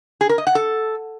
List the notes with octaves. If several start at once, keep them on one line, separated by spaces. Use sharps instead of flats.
G#4
A#4
D#5
F#5
A4